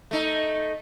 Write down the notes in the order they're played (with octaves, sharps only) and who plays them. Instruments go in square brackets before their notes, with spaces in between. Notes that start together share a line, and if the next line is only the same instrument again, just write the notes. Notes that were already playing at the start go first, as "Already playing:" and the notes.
[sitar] A3 D#4